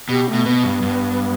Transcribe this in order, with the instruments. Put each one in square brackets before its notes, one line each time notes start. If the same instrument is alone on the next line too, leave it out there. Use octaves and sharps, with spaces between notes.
[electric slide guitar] B2 [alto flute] G4
[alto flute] A3
[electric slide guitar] B2
[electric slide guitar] B2 [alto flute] B3
[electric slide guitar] G2
G2